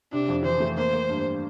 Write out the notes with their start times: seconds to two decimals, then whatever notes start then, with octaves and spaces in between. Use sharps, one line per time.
0.13 C3 D4
0.28 F2
0.45 E3 C5
0.60 A3
0.77 A#3 C5
0.93 A#3
1.09 G2